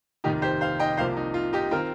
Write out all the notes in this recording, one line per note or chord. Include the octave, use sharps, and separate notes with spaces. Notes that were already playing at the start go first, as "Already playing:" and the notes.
F1 D#2 D#3 D#4 G4
G4 C5
C5 F5
D#5 G5
C2 C3 F3 A#3 C5 F5
D#4
F4
D#4 G4
D#3 C4 F4 A#4